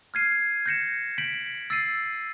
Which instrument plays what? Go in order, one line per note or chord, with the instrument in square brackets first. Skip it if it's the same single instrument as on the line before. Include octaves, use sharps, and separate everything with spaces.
[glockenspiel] F6 G#6 C7 D#7
G6 A#6 C#7 E7
G6 B6 D7 F#7
E6 A6 C7 D#7